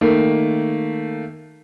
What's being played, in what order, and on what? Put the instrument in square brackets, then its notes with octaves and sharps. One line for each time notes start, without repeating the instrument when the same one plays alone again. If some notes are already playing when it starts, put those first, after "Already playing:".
[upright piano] D#3 A3 A#3